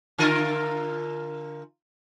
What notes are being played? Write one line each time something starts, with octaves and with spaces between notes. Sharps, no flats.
D3 F4 A#4